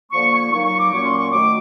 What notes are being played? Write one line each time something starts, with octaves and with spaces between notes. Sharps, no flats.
D3 F3 A#3 C#6
C#6
F#3 A#3 D#4 C#6
C#6
D6
A#2 F#3 A#3 C#4 C#6
C6
C#6
D#3 F#3 A3 D6